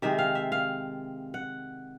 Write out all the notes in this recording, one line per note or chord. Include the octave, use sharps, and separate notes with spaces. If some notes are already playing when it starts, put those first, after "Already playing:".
C3 D#3 G#3 E5
F5
E5
F5
F#5